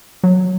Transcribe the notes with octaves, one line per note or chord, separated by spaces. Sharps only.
F#3